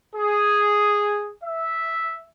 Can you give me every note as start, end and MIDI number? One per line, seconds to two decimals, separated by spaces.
0.14 1.32 68
1.43 2.23 76